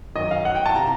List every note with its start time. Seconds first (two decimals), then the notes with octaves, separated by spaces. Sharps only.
0.15 G#1 F#2 D#3 F#3 D#5
0.31 F5
0.45 F#5
0.55 G5
0.66 A5
0.74 C3 A#5